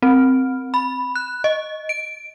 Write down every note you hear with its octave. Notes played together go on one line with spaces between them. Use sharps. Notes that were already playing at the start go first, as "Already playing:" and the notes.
C4
B5
F#6
D#5
D7